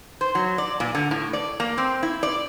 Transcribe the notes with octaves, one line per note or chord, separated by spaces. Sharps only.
C5
F#3
D5
A#2
D3
A2
D5
A#3
C4
E4
D5